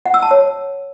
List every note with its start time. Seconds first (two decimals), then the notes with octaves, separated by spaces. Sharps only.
0.06 F#5
0.14 E6
0.22 A5
0.31 C#5